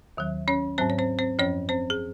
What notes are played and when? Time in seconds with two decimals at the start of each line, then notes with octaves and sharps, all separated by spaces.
0.17 D#2 D#3 F#3
0.48 C#4 C#5
0.78 G#2 F#3 C4 C5
0.90 C#5
0.98 C4 C5
1.19 C4 C5
1.39 F#2 F3 C#4 C#5
1.69 C4 C5
1.90 G#4